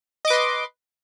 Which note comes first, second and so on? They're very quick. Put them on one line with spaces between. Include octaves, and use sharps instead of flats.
D#5 D6 B4 C6